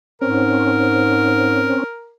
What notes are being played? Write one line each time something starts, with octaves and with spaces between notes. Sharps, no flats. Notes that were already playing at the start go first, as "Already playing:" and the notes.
G#2 C4 C#4 A#4